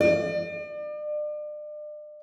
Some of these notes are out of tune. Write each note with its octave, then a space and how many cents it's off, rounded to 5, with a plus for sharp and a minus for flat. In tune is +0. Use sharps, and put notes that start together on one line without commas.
D5 +40